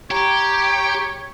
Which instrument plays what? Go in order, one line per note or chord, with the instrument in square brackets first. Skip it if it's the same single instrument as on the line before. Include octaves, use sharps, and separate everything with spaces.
[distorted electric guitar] G4 [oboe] C#5 [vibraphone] A#5